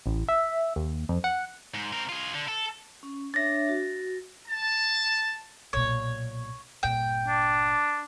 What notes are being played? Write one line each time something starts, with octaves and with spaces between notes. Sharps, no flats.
A1
E5
D#2
F2
F#5
G#2
C4 A#4
F4 G#4
D3
A4
C#4
D4 C#5 E5 A6 A#6
F#4
A5
B1 A#2 C#5
G1 A#2 G5
D4